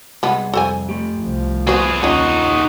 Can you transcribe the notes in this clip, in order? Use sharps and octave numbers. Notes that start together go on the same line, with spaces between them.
C2 G#3 B3 G#4 A5
F2 A4 C5 G#5
A3 G4
C2 F3
B3 F#4 G#4 B4 C5
D#2 C#4 D#4 F4 F#4 D#5